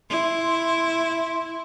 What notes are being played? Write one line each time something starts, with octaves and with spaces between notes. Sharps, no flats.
E4 C6